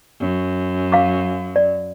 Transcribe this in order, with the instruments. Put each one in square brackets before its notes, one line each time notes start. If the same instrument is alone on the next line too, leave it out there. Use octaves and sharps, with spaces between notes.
[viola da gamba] F#2
[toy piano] F5 D6
D5